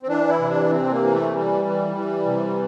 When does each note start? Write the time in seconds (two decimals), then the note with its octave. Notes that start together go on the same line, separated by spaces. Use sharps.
0.03 C4
0.08 E3 D4
0.29 E4
0.39 C3
0.49 D4
0.70 C3 C4
0.91 A#3
1.02 E3
1.12 A3
1.33 E3 G3
1.64 E3
1.96 E3
2.26 C3